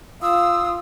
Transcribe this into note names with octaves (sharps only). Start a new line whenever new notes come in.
F4 D#6 E6